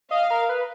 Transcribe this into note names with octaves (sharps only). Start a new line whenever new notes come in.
D#5 F5
A#4
B4